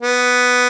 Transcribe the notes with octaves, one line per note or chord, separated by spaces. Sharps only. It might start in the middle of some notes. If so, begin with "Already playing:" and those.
B3